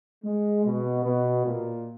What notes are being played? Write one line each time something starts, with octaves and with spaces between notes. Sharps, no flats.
G#3
B2
B2
A#2